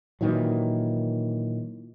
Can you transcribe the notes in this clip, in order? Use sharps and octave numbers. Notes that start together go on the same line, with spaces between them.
A#2 D#3 E3 F#3